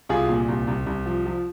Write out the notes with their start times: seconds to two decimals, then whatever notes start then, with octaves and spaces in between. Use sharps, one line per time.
0.09 C2 F4 G#4
0.29 A#2
0.48 C2
0.68 C2
0.86 C2
1.06 F3
1.26 F3